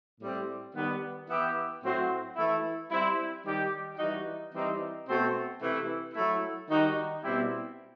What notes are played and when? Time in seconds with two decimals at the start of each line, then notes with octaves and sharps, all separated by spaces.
0.20 A2 G3 C4
0.74 D#3 G3 B3
1.28 E3 B3 E4 G4
1.82 A2 F#3 C4 F#4
2.36 E3 A3 E4
2.90 G3 C4 E4
3.44 D#3 G3 D#4 G4
3.98 E3 G3 D#4 F#4
4.53 E3 G3 C4 D#4
5.07 B2 A3 C4 F#4
5.61 C3 E3 A3 E4
6.14 F#3 A3 E4
6.68 D#3 G3 D#4 F#4
7.23 B2 G3 C4 E4 G4